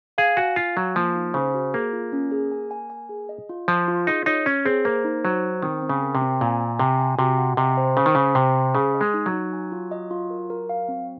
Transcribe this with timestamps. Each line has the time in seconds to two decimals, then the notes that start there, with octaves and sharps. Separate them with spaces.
0.18 G#4 F5
0.37 F#4 G#5
0.56 F4 F5
0.76 F#3 G#5
0.95 F3 A#3
1.15 D#4
1.34 C#3 C5
1.54 F#4
1.74 A#3 G#4
1.93 F4
2.13 C#4
2.31 G#4
2.51 G#5
2.71 G#5
2.90 G#5
3.09 G#4
3.29 D#5
3.49 F4
3.68 F3 F4
3.88 F4
4.07 D#4 G#4
4.26 D#4 C#5
4.46 C#4 C#5
4.65 C4 G#4
4.85 A#3 C5
5.04 D#4
5.24 F#3 C5
5.43 C5
5.62 D#3 C4
5.82 C4
5.89 C#3
6.02 A#4
6.15 C3
6.22 C4
6.41 A#2 G#5
6.60 G#5
6.79 C3 G#5
6.99 G#5
7.18 C3 F#4
7.38 F#5
7.57 C3 D#5
7.77 C5
7.97 C#3 C5
8.06 D#3
8.15 C#3 C5
8.35 C3 C5
8.55 C5
8.75 C#3 G#4
8.94 D#5
9.01 G#3
9.14 D#4
9.26 F#3
9.33 D#4
9.53 G#5
9.72 F4
9.91 D#5
10.11 F4
10.30 A#4
10.50 A#4
10.69 F5
10.89 C4